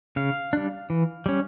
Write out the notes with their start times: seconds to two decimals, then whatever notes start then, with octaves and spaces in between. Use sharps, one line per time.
0.16 C#3 F5
0.53 G3 D4
0.90 E3
1.26 G3 C#4